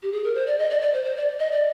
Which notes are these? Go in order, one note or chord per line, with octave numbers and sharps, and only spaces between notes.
G4
G#4
A#4
C5
D5
D#5
D5
D5
C5
C5
D5
D#5
D5